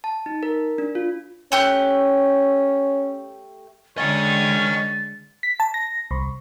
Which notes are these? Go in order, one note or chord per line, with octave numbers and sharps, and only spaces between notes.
A5
D#4
A#4
D4
F4
A3 C#4 G4 F#6
D3 G#3 C#4 C#5 D#5 G5 A6
B6
A5
A#6
C2